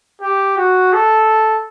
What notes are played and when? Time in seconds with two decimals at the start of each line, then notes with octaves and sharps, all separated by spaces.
0.22 G4
0.57 F#4
0.92 A4